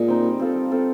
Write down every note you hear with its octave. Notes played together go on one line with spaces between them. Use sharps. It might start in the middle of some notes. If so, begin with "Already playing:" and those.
Already playing: A#2 G#3
C4 D#4
G3
C4 F4 A4
G3
C4 F4 A4